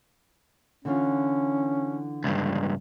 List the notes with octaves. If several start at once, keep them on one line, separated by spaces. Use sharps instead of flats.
D3 E3 C#4 F4
C#2 G2